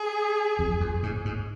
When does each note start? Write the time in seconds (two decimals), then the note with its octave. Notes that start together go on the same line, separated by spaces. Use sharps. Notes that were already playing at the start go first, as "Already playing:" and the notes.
Already playing: G#4
0.59 F2
0.80 F2
1.03 G#2
1.25 G#2